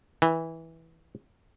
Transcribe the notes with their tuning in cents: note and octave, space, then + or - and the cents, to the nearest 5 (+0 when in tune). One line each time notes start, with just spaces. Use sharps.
E3 -15